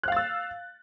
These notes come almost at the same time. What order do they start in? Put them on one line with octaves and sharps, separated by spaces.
F#6 F5 A6 E6